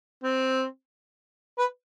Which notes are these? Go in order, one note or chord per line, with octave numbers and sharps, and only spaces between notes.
C4
B4